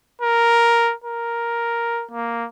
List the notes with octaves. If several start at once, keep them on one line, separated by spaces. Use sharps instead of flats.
A#4
A#4
A#3